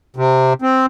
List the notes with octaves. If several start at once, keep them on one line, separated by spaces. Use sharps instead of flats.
C3
C4